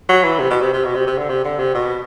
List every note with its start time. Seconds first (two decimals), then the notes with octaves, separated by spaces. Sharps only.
0.09 F#3
0.24 E3
0.39 C3
0.50 B2
0.61 C3
0.73 C3
0.84 B2
0.95 C3
1.07 C3
1.18 D3
1.29 C3
1.45 D3
1.59 C3
1.74 B2